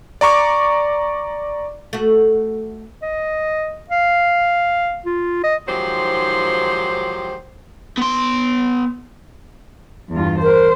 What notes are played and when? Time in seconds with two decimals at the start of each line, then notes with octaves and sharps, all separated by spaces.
0.21 D5 A#5 C#6 D6
1.93 A3 F#4
3.02 D#5
3.90 F5
5.06 F4
5.44 D#5
5.68 G#2 D#3 F3 F#3 G4 C5
7.97 B3 C6
10.11 E2 G2 F4
10.43 A#4 C5